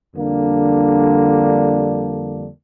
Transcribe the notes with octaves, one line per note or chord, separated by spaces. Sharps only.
F2 D3 G3 A#3 D4